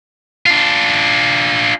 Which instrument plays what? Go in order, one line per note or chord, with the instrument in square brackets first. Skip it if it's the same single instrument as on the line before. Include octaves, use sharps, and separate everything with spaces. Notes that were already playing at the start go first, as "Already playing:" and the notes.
[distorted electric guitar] D4 F4